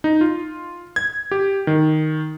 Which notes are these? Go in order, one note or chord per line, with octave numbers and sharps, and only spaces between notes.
D#4
F4
G#6
G4
D#3